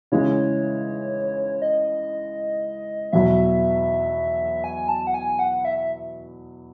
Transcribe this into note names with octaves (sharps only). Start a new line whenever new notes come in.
C#3 E3 G#3 C#5
D#5
E2 B2 F#3 E5
G#5
A5
F#5
G#5
F#5
E5